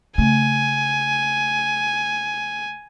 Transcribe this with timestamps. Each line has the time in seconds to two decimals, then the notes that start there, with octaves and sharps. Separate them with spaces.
0.18 C#3 A3 G#5